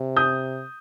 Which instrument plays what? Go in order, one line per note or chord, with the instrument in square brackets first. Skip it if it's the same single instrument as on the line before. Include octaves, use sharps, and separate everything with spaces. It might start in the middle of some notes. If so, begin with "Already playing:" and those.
Already playing: [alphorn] C3
[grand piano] D#6 G6